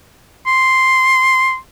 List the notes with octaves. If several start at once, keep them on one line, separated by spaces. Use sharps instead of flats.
C6